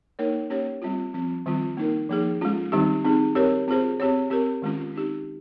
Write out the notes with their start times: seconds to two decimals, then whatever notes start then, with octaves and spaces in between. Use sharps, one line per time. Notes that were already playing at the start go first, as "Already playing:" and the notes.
0.19 A#3 D#4 A#4 C#5
0.50 A#3 C#4 G4 C#5
0.82 G3 C4 F4
1.14 F3 C4 F4
1.46 D#3 G3 C4 F4
1.77 A#3 D#4 A#4
2.09 F3 A#3 D#4 G#4
2.41 G#3 C#4 F4
2.72 D#3 G3 C4 D#4 G4
3.05 C4 D#4 G#4
3.35 C4 G4 A#4 C#5
3.68 C4 F4 G#4 C5
4.00 C4 G4 C#5
4.30 C4 G4 A#4
4.62 D#3 G#3 C#4 F4
4.94 C4 D#4 G4